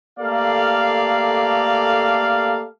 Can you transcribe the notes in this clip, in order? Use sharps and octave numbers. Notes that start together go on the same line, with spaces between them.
A3 A#3 G4 A4 D5 F5